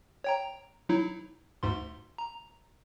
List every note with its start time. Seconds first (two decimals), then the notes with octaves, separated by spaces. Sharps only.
0.24 C#5 G5 A#5
0.89 F#3 D#4 E4
1.63 D2 G#2 C6
2.18 A#5